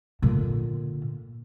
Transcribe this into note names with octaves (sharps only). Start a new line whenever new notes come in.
A#2 D3